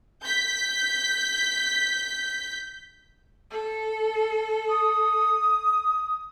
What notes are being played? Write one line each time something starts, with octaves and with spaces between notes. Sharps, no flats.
G6 B6
A4
D#6